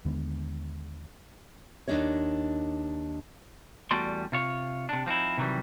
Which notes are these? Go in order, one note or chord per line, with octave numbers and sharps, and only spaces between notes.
D#2 D3 G#3 B3
D#2 D3 D4 D#4 C#5
E2 G3 A3 F#4 D5 C6
C3 F4 C#5
C3 D4
F3 C4 D#4 E4
C3 D#3 E3 F#3 G3